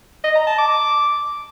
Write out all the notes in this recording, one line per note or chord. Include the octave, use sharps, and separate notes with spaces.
D#5
A#5
A5
D6